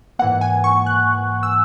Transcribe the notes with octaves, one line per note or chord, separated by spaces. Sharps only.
G#2 E3 A#3 F#5
G#5
C#6
F#6
E6